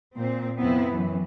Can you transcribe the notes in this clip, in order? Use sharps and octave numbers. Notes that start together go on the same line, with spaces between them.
A#2 C4
F2 C3 B3 C4 E4
F#2 E3